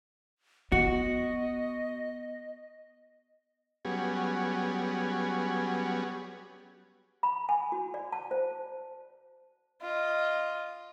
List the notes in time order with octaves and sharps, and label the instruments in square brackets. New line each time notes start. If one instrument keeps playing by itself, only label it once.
[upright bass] B3 [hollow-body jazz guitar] F#4 [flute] D#5
[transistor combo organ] F#3 G3 B3 C#4 G#4
[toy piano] B5
G#5
F#4
D5
A5
C5
[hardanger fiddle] F4 D#5